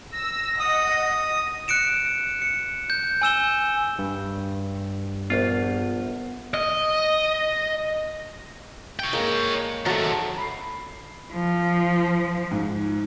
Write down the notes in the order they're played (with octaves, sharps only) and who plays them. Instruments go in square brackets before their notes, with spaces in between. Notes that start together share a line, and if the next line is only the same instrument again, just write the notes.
[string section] E6 [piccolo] A#6
[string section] D#5 F#5 [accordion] D#6
[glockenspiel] F#6 C#7 D7 E7
C#7
G6
G#5 E6 E7 G7
[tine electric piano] G2
[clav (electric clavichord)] A#1 F4 [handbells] B3
[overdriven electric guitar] D#5
[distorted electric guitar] C#5 G5
[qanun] G#3 A#3
[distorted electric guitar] D#3 A4 [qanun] F#3 A3
[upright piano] B5 C7
[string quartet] F3
[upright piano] G#2